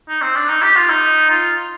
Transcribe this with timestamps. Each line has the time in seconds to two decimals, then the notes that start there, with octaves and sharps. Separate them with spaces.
0.09 D#4
0.22 C4
0.35 D4
0.49 D#4
0.62 G4
0.75 F4
0.89 D#4
1.30 F4